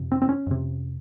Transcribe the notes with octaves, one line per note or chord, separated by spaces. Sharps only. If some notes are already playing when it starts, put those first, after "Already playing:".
Already playing: F2 C3
C4
C4
C#4
F2 C3